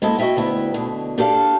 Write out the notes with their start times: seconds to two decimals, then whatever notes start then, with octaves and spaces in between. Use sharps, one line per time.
0.02 G#3 A#3 E4 A4 D#5
0.18 F#4 D#5 E5 G5
0.36 D2 B3 E4 G5
0.74 B2 D3
1.18 D4 G4 A4 B4 F5